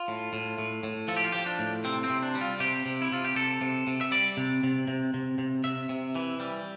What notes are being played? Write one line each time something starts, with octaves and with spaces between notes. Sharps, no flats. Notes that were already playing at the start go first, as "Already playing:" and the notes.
Already playing: F4
A2
A2
A2
A2
F3 A4
G4
F4
F3 G4
D4
A2
C3 C4
C4
C3
D4
G3
F4
C3 G4
C3
E4
C3 F4
G4
C3 A4
C3
C3
E5
G3 D5
C3
C3
C3
C3
C3
C3 E5
C3
E3
G3